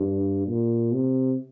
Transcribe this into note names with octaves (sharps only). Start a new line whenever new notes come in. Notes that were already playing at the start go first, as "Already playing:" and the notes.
Already playing: G2
A#2
C3